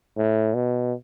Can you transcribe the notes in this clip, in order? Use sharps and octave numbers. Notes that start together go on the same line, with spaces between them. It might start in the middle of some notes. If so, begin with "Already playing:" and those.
A2
B2